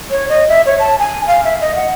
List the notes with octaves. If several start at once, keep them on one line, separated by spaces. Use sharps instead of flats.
C#5
D#5
E5
C#5
A5
G#5
F5
E5
D#5
F#5